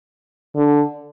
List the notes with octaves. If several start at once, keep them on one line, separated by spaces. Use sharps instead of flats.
D3